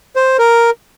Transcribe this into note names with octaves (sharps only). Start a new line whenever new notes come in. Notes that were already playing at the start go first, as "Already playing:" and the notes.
C5
A#4